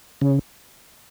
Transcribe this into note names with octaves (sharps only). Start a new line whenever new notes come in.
C#3